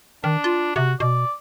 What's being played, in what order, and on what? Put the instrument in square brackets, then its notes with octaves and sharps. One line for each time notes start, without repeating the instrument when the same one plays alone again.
[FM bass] D#3 [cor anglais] D4
[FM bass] F4
[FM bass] C3 [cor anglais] F#4
[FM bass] B2 [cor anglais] D5